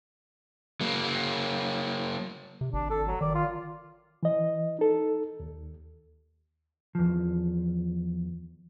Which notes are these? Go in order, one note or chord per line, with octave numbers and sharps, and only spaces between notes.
F#3 A#3
C3
G#1 D4
A4
F#3
D#3 D5
F4
E3 D#5
D#4 A4
D#2
E2 F3